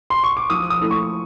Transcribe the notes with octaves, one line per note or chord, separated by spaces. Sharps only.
C6
C#6
D6
F3 D#6
D#6
A3 C#4 E4
C#6